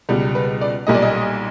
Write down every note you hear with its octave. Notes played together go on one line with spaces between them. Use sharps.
C#2 B2 G3
B4
D5
B1 A#2 G3 D#5
D5
D#5